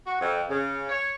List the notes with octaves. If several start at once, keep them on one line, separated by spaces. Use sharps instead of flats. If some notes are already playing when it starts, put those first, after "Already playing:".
F#4
F2
C#3
C#5